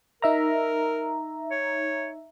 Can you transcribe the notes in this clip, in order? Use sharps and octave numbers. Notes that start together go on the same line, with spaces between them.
D#4 A#4 E5 A#5
C#5